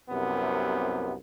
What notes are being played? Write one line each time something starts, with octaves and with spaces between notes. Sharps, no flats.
C2 F#2 C3 B3